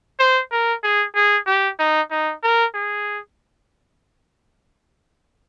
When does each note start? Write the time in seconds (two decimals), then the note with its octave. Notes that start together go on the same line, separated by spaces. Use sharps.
0.19 C5
0.52 A#4
0.83 G#4
1.15 G#4
1.47 G4
1.79 D#4
2.11 D#4
2.43 A#4
2.74 G#4